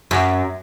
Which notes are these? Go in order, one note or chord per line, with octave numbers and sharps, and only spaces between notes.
F#2